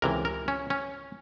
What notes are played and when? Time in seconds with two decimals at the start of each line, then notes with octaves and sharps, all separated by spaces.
0.02 C#2 C3 E3 A#4
0.25 A#4
0.48 C#4
0.70 C#4